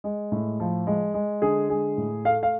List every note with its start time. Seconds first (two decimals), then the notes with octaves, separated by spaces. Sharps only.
0.04 G#3
0.32 A2
0.60 F3
0.87 G#3
1.14 G#3
1.42 D3 G#4
1.69 G#3 G#4
1.98 A2
2.25 A3 F5
2.43 F5